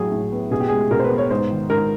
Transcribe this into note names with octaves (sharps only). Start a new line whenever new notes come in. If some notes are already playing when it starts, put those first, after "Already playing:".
Already playing: A2 F#3 G#4
A2
B3
B2 G#4
G4
G#3 G#4
B2 A#4
C5
B4
B3
C#5
G#2 C5
D#3
G#2 A#4